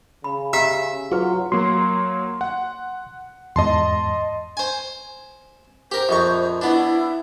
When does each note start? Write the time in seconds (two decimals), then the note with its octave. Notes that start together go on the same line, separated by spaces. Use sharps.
0.24 C#3 B5
0.53 G4 E5 A#5
1.12 F#3 F4 F#4 G#4 B4
1.52 F#3 A#3 C6
2.41 F#5
3.56 E2 G#2 D#5 A5 C6
4.57 C5 G#5
5.92 G4 A#4 C5
6.09 A#1 F2 C#6
6.62 B3 D4 E4